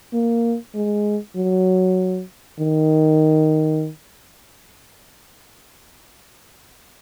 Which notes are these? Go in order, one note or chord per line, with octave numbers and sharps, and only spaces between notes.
A#3
G#3
F#3
D#3